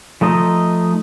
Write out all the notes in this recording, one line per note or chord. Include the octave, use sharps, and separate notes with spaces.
F3 A3 D#4 D#5